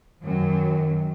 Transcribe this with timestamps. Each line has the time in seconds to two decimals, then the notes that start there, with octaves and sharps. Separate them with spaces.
0.21 F#2 D#3 F#3